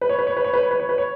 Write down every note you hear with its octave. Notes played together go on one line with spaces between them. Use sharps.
B4
C#5
B4
C#5
B4
C#5
B4
C#5
B4
C#5
B4
C#5